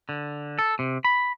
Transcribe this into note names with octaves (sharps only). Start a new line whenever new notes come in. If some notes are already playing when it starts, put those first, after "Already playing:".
D3
A4
C3
B5